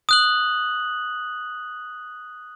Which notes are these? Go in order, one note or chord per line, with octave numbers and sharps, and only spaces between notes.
D#6 F#6 F#7